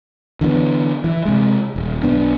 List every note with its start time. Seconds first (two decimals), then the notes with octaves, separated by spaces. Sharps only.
0.41 D3 E3 A3 B3
1.04 E3
1.25 C3 G#3
1.76 D#1
2.03 B1 B2 B3 D4